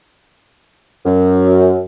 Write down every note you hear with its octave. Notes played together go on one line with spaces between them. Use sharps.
F#2